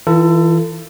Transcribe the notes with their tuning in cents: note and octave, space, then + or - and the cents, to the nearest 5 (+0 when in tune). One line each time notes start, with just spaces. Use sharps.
E3 -15 F4 -40 A4 +25